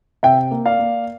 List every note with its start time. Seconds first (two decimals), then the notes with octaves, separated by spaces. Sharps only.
0.23 C3 E5 G5
0.51 A#3
0.66 D5 F5
0.79 A#3